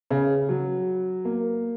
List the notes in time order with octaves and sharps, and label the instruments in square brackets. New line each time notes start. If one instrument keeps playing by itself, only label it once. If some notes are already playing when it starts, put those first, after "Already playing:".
[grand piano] C#3
F#3
A#3